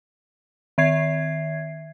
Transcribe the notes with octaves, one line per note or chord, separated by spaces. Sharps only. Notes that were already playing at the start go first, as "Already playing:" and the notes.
D#3 E5 G#6 C7